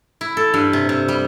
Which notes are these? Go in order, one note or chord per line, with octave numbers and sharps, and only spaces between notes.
E4
A4
G2
C3
C3
G3